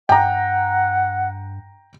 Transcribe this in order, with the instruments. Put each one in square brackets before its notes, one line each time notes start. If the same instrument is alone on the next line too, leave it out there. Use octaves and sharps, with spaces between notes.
[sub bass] G2 [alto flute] F#5 [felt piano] G5 A#5